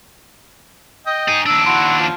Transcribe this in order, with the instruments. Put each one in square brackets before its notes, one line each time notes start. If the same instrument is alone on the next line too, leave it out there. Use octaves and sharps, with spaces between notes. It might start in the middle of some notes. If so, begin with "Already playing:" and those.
[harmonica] D#5 G5
[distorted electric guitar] D#4 G#4
[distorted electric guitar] D#2 D4 [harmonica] E6
[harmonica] E4 F#4 C6
F3